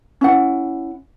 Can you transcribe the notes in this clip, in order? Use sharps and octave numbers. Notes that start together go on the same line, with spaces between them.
C#4 E4 F#5